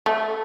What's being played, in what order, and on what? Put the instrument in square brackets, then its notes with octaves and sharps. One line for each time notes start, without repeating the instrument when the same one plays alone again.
[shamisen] A3